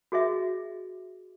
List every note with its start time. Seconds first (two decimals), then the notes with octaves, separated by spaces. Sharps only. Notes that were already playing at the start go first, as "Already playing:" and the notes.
0.12 F#4 G#4 D#5 E5